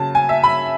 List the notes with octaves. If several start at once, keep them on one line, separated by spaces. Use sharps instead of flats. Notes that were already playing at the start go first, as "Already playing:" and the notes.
Already playing: C#3 F#3 A5
G#5
E5
B5